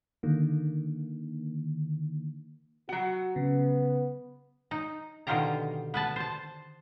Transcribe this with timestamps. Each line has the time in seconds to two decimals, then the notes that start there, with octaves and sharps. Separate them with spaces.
0.23 D3 D#3 A#3
2.89 F#3 F#4 F#5
3.36 C#3 B3
4.71 D#4
5.27 B2 D3 D#3 F4 G4 A#5
5.94 B3 B4 A5
6.16 C5 A5